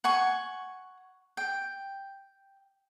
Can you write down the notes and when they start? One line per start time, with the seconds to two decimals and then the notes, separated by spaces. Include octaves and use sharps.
0.04 F#5 G#5 C#6
1.37 G5